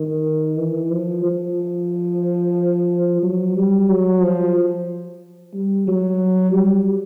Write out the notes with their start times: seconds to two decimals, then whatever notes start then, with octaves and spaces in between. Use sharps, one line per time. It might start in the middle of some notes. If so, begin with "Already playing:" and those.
Already playing: D#3
0.58 E3
0.92 F3
1.25 F3
3.23 F#3
3.55 G3
3.89 F#3
4.22 F3
5.54 G3
5.87 F#3
6.53 G3